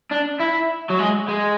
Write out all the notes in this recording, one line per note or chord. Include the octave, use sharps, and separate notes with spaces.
D4
E4
F#3
G#3
G#3